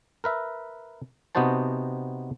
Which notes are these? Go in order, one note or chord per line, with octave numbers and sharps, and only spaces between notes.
A#4 B4 E5
C3 B3 D#4 F#4 C5 A5